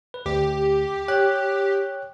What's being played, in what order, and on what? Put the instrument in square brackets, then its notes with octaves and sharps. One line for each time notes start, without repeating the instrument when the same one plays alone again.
[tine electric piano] B4
[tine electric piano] D2 [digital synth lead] G4
[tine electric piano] C#5 G5 F#6